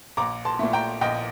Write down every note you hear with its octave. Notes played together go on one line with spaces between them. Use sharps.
A#1 A#5 D6
A5 C6
A#2 A3
G5 A#5
A#1 D#5 G5